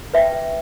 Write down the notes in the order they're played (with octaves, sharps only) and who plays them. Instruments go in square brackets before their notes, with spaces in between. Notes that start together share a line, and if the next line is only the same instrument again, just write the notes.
[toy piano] B4 E5 G5